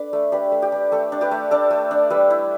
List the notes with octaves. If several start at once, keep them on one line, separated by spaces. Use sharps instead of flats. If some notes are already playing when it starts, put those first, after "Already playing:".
Already playing: D4 A4 B4 D5
A3
D4 G4 B4
A3
G4
D4
A3 A4
D4
G4 B4
A3
D4 A4 D5
A3
D4
G3 B4 E5
E4